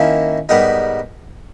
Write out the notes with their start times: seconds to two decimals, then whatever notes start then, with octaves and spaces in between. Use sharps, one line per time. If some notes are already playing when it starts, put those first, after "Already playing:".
Already playing: D#3 A#3 C#4 E4
0.49 G#2 G3 B3 D#4 A#4